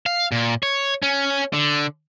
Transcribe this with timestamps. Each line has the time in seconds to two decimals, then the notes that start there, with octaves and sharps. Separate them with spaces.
0.06 F5
0.32 A#2
0.63 C#5
1.03 C#4
1.53 D3